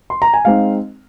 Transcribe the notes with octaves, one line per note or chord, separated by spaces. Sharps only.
C6
A#5
G#5
G#3 C4 D#4 F5